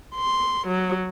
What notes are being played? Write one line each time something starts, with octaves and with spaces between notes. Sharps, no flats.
C6
F#3